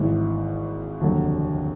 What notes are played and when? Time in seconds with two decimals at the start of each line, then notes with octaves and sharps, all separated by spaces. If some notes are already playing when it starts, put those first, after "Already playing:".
Already playing: G#1 G#2 E3
1.01 F1 D#2 D3 F#3